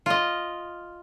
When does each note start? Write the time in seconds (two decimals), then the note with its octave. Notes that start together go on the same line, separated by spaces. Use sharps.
0.06 F4 D#5